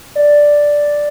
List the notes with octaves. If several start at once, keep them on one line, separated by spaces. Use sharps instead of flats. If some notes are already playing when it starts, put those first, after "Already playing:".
D5